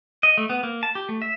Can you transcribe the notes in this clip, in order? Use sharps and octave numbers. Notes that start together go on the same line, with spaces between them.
D#5
A3
B3
A#3
A5
G4
A3
E5